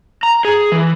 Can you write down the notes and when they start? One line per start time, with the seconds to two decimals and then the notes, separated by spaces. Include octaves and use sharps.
0.23 A#5
0.45 G#4
0.72 E3